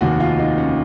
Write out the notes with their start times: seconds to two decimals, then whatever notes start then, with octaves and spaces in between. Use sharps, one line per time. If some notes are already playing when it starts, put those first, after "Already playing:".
0.01 F1 D#2 D#3 F#4
0.20 F4
0.39 D#4
0.58 C#4